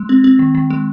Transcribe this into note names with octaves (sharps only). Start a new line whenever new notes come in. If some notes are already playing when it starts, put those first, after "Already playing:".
Already playing: G#3
C4
C4
D#3
D#3
G#3